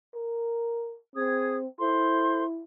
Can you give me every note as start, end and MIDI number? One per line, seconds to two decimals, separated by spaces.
0.14 0.96 70
1.16 1.67 60
1.16 1.57 68
1.16 1.57 87
1.16 1.57 92
1.80 2.64 64
1.80 2.43 69
1.80 2.43 72
1.80 2.43 84